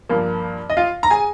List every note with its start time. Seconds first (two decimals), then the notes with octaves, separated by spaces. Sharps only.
0.09 G2 F3 A#3
0.70 D#5
0.77 F4 F5
1.03 A#5
1.10 G#4 G#5